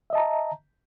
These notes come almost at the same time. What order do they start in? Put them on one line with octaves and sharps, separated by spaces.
E5 D#5 A5 A#5